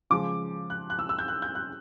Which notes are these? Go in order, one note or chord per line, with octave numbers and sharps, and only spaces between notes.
C#3 F3 G#3 D6
F#6
F#6
E6
E6
G6
F#6
G6
F#6